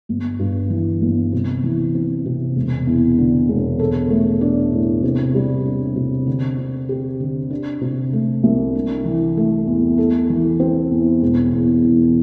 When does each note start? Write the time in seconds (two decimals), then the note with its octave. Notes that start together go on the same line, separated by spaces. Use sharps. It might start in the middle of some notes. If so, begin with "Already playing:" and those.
0.09 G1
0.39 G2
0.70 E3
1.02 G1
1.32 C3
1.63 E3
1.95 C4
2.26 C3
2.56 E1
2.87 E2
3.18 D3
3.49 E1
3.79 A4
4.10 A3
4.41 D4
4.73 A2
5.03 C3
5.35 G3
5.65 D4
5.96 C3
6.27 D3
6.58 C4
6.89 G4
7.20 D3
7.50 D4
7.81 C3
8.13 A3
8.43 C2
8.75 D4
9.05 E3
9.37 A3
9.67 E2
9.98 A4
10.30 E3
10.60 C4
10.91 E2
11.22 E1
11.53 E2
11.84 E3